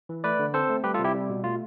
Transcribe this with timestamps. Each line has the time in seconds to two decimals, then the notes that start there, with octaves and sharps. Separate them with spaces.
0.09 E3
0.24 A3 B4 D5
0.39 D3
0.54 C4 A4 C5
0.69 A3
0.84 G3 G4 B4
0.94 F4 A4
0.99 C3
1.04 E4 G4
1.15 G3
1.30 B2
1.44 A3 F4